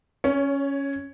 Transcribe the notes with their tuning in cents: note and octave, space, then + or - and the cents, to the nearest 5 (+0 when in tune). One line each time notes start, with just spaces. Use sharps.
C#4 +0 C#5 +25